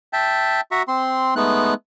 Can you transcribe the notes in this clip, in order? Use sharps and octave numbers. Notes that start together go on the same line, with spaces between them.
E5 G5 A5
F#4 E5 A#5 C#6
C4 C6
G#3 A3 B3 D#4 F#6